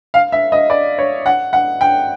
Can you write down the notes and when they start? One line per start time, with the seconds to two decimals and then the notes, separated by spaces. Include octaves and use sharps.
0.14 F5
0.32 E5
0.52 D#5
0.70 D5
0.98 C#5
1.26 F#5
1.53 F#5
1.81 G5